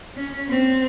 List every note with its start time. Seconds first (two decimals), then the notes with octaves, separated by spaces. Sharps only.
0.16 C#4
0.49 C4